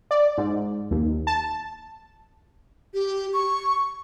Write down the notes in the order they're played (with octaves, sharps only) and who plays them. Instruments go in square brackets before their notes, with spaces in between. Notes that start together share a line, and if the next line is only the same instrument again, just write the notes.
[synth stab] D5
G#2
D#2
A5
[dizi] G4
C#6